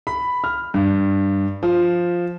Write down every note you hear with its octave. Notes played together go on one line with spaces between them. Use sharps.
B5
F6
G2
F3